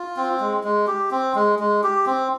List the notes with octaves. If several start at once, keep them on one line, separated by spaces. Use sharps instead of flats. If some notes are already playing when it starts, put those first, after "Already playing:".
Already playing: F4
C4
G#3
G#3
G4
C4
G#3
G#3
G4
C4